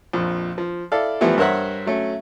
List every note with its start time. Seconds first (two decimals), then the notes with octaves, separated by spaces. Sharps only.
0.13 A#1 F2
0.58 F3
0.92 E4 A4 D5 F5
1.21 E3 F3 G3 A3 B3 E4
1.38 G2 A#4 C5 C#5 E5 F#5
1.86 F#3 A3 C#4